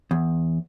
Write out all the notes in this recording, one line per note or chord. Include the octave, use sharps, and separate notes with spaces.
E2